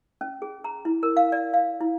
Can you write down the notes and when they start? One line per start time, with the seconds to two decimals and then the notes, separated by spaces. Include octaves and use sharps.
0.21 C#4
0.42 G#4
0.64 A#5
0.85 E4
1.03 A#4
1.17 F5
1.32 D5
1.54 F5
1.81 E4